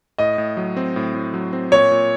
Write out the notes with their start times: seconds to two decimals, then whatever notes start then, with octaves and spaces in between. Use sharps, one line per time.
0.18 A2 D#5
0.38 A2
0.57 F#3
0.77 C4
0.96 A2
1.15 A2
1.34 F#3
1.53 C4
1.72 A#2 C#5
1.91 A#2